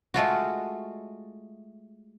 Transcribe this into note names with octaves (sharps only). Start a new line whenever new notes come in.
G#3 A3 F4 F#4